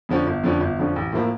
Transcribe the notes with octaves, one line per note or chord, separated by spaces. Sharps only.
F2 D3 F3 C#4
G1
F2 D3 F3 C#4
G1
F2 D3 F3 C#4
A1
A2 F3 A#3 E4